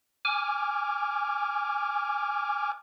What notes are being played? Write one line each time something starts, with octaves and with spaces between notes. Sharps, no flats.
G#5 D6 F6